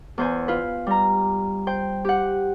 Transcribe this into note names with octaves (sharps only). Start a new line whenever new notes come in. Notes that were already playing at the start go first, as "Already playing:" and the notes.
E2 C5 G#5
F4 B4
G3 A#5
C5 G5
G4 F#5